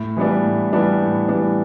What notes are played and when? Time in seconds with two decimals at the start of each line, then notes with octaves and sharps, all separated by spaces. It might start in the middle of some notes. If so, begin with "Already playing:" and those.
Already playing: A2
0.17 E3 G3 B3 D4
0.45 A2
0.73 E3 G3 B3 D4
1.01 A2
1.29 E3 G3 B3 D4